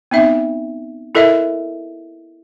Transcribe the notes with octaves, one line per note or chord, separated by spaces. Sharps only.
B3 C4 D#4 E5
E4 A4 A#4 D#5 E5